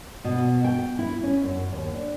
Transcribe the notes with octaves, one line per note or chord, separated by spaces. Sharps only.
B2
G5
E4
C#4
F#2
D#2
D4